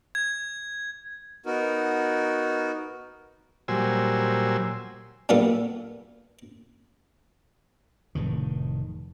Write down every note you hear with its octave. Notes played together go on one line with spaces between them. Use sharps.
G#6
B3 D#4 F#4 A#4
A#2 F#3 G3 C5 G#5 E6
A#2 G3 B3 F4 A4
F1 A2 D#3